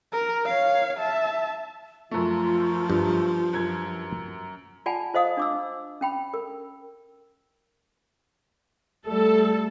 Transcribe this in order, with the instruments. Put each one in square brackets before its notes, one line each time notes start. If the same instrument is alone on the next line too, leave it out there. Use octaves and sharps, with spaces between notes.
[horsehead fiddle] A#4
C#5 F5
E5 A5
[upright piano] F#2 A3 [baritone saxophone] F3 [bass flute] F4
[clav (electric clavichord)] G2
[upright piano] F#2 G#6
[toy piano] F4 D5 F#5 G#5 A5 B5
F4 C5 D#5 F5 D#6
D4 D6 E6
C#4 G5 B5
A#4
[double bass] G3 A3 [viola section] A4